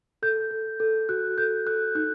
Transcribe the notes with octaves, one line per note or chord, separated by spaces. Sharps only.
A4 G6
A4
A4
F#4 F#6
A4 G6
A4 F#6
D#4 F#6